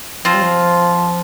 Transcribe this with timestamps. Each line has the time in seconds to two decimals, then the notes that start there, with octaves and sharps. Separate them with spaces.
0.25 F3 C4 F4 C5
0.34 G3
0.43 F3